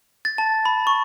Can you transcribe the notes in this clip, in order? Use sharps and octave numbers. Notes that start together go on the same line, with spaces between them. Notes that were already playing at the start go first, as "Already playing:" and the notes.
A6
A5
B5
C#6